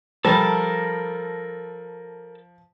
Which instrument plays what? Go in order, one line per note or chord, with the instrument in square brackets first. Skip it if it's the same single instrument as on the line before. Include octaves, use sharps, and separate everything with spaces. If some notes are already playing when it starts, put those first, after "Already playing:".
[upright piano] F3 [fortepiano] G3 [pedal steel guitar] A4 A#4 A5